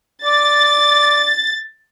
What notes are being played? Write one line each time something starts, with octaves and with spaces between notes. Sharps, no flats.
D5 A6